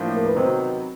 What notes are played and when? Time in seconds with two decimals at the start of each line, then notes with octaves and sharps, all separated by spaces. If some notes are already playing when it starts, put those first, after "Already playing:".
Already playing: A2 F3 A#3 D4
0.17 A#4
0.26 B4
0.35 C3 D#3 F#3 B3 C5